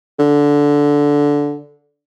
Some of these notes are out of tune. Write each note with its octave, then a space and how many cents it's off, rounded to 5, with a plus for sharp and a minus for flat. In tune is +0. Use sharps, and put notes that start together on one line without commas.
D3 -15